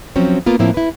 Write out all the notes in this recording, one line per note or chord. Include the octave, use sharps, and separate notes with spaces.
F3 F#3 C4 C#4
A#3 B3 F4
A2 F3 A#3 C4 E4
E4 B4